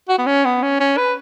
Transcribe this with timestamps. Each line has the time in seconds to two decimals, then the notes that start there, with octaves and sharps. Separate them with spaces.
0.09 F#4
0.18 B3
0.26 C#4
0.45 B3
0.62 C#4
0.80 C#4
0.97 B4